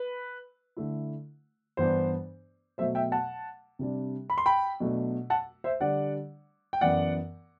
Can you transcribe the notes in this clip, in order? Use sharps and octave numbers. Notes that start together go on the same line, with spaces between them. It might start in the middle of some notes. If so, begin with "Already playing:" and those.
Already playing: B4
D3 A3 E4
G2 E3 B3 D4 C5
B2 F#3 A3 C5 E5
E5 G5
F#5 A5
C3 G3 D4
B5
C6
G5 B5
B2 F#3 A3 D4
F#5 A5
C5 E5
D3 G3 D4 D5 F#5
G5
F#2 E3 B3 D5 F#5